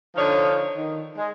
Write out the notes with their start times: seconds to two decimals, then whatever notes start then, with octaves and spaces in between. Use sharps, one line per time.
0.16 D3 F3 D4 D#4 C#5 F5
0.74 D#3
1.17 G#3